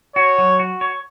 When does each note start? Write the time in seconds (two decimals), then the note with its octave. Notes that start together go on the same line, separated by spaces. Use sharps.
0.16 F#4 C#5
0.38 F#3
0.59 F#4
0.81 C#5